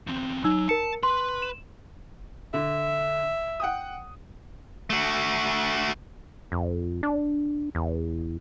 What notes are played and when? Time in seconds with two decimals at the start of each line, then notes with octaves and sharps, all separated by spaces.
0.07 E2 C4
0.44 F#3 D#4 E6
0.69 A#4 A5 C#7
1.03 B4 C6
1.42 E7
2.54 D3 E5
3.60 F#5 G5 D#6
4.90 A3 F#4
6.52 F2
7.03 D4
7.75 E2